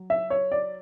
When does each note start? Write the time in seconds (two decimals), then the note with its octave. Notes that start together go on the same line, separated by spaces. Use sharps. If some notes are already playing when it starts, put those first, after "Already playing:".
Already playing: F#3
0.10 E5
0.30 C#5
0.52 D5